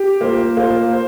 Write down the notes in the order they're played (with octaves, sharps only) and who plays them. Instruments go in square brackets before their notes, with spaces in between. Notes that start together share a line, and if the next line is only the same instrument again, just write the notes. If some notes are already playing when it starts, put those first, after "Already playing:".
Already playing: [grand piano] G4
[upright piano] A#3 F4 C5
A#3 F4 C5
C5